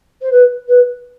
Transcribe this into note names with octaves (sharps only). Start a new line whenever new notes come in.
C5
B4
B4